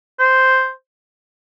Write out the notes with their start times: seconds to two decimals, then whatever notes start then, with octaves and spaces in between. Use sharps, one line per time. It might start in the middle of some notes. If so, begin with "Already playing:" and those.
0.20 C5